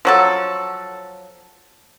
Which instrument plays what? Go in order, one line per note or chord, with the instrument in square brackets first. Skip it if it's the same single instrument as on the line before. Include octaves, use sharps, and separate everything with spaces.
[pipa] F3 F#3 A4